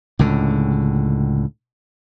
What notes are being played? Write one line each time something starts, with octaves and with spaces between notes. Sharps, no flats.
C#2 A2 D3